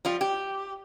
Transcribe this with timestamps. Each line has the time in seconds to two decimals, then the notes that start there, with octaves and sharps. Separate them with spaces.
0.05 F3 G3 F4
0.21 G4